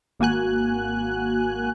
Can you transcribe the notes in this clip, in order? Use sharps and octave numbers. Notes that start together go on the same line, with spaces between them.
G#1 A#3 F#4 G#5 F#6